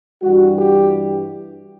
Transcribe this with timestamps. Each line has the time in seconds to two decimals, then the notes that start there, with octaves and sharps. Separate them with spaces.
0.22 G2 E3 G3 F#4
0.56 G4